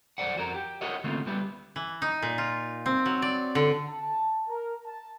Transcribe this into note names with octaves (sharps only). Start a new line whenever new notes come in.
F#2 C#3 C5 D5 F#5
F2 F#4 A#4
G4
F#4 A#4 C#5 D#5 E5 F#5
D3 A3 A#3 C4 C#4 F4
D2 G3 B3 G4 B4 E5
E3
D#4
A#2
F4
C4
F#3
D5
D3
A5
A#4
A5